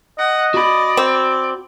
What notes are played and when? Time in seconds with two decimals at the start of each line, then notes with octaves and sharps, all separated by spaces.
0.19 D#5 F#5
0.54 F#4 D5 B5
0.97 C4